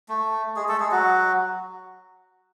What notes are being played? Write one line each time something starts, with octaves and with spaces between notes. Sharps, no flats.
A3
G#3 G#4
A3 A4
G#3 G#4
F#3 F#4